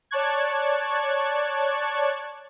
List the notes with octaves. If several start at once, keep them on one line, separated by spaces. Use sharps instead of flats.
C#5 D5 A5 C#6 F#6 G#6